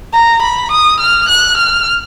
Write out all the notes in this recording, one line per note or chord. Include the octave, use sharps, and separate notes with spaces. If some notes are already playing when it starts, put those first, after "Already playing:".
A#5
B5
D#6
F6
F#6
F6